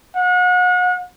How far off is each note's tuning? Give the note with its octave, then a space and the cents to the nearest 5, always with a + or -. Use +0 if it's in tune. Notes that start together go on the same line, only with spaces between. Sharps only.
F#5 -35